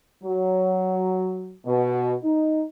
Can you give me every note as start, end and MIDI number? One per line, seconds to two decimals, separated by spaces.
0.24 1.55 54
1.66 2.13 47
2.22 2.63 63